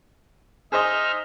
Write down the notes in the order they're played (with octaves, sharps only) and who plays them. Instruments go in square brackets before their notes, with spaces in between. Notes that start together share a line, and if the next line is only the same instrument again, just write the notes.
[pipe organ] D#4 E5 F6 [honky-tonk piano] G#4 C5 D#5